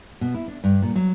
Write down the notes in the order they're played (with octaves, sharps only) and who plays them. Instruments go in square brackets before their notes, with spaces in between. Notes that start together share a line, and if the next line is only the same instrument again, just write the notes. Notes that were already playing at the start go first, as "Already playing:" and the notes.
[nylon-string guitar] B2
E4
D4
G2
A#2
F#3